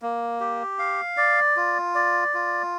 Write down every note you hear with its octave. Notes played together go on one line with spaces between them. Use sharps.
A#3
G4
F5
D5
F4
D5
F4